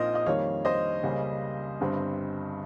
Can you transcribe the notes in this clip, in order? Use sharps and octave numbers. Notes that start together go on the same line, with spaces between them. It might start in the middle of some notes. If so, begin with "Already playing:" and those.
Already playing: A#1 A#2 F3 C4 D#4 A#4 C5 D#5
D#5
F2 D#3 G3 A#3 C#5 F5
C5 D#5
C#2 C#3 G3 A#3 C#4
G1 G2 G3 C4